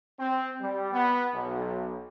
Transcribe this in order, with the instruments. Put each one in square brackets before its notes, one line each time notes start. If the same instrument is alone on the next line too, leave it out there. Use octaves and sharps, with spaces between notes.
[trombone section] C4
G3
B3
B1